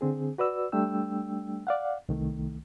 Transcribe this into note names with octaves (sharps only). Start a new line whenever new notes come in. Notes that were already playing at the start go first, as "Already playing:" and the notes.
D3 C4 G#4
F#4 B4 D5 E6
G3 A3 D4 G5 E6
D5 F5 F#5
C2 D#3 A3